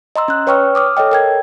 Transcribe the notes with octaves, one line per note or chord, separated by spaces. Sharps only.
D#5 A#5 C6 E6
C#4 F#6
B4 C#5 G5 C#6 E6 F6
D6 D#6 F6
A4 C#5 D#5 G5
A#4 G5 G#6